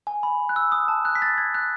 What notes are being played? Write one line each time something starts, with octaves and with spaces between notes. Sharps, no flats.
G#5
B5
F#6
E6
D#6
A5
F#6
B6
A6
G#6
F#6